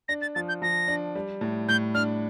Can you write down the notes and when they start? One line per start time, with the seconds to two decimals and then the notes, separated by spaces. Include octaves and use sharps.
0.08 D4 A#6
0.22 A6
0.35 F3 A6
0.48 G6
0.62 F3 A#6
0.88 D4
1.15 G3
1.41 A2
1.68 A2 G6
1.94 D4 F6